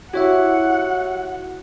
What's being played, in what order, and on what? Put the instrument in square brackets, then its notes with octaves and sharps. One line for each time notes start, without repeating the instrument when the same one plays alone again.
[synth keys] E4 [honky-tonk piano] F#4 [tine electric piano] G4 C#5 E5 [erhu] F#5